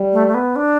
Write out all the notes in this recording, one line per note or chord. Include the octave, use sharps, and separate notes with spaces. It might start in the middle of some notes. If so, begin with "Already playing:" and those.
Already playing: G3
A3
A3
B3
D4